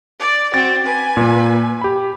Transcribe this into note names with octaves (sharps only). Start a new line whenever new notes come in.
D5
C4 F#4 A6
B4 G#5
A#2 A#3
G4 B5